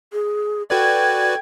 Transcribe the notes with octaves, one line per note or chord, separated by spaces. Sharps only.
G#4
F#4 A4 B4 D5 G5 G#6